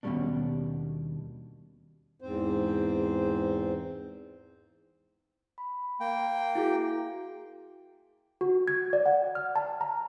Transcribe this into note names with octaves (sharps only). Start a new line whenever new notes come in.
D#2 B2 D#3 G3 C#4 D4
E2 G#2 C4 C5
B5
A#3 G5
E4 F#4 G#4
F#4
G#6
D5
F#5
F6
A5
A#5